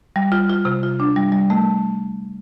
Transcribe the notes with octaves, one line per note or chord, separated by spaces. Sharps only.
G3
F4
F4
C3
F4
D4
G3
G3
A3